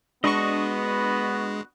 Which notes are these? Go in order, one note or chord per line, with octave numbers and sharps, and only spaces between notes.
G#3 B3 D4 F#4 B4 D#5 C#6